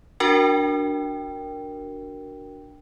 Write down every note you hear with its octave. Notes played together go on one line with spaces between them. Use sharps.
D4 F#4 A#4 G5